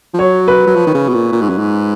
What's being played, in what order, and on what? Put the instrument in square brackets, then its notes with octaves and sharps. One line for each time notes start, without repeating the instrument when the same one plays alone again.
[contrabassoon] F3
[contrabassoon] F#3 [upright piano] C#5
[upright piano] B4
[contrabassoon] F#3
F3
D#3
C#3
B2
A#2
A#2
G#2
F#2
G#2